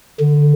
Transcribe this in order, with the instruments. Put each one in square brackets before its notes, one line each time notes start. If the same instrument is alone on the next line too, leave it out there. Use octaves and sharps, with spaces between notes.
[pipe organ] D3